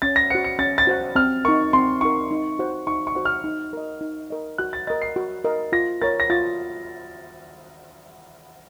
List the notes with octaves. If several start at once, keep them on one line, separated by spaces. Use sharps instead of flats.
C#4 A6
A#6
F#4 C5 F#5 C#7
C#7
C#4 A6
A6
F#4 C5 F#5
C4 F6
D#4 A#4 C#6
C4 C6
D#4 A#4 C#6
D#4
F#4 C5 F#5
D#4 C#6
C#6
F#4 C5 F#5
F6
D#4
A#4 D#5
D#4
A#4 D#5
F#4 F#6
A6
A#4 D#5 A6
C7
F#4
A#4 D#5
F4 A#6
A#4 C#5 A6
A#6
F4 A6